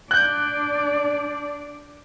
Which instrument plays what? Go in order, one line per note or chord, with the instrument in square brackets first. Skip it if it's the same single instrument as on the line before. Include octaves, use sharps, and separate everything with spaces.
[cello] D4 D5 [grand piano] F#6 G6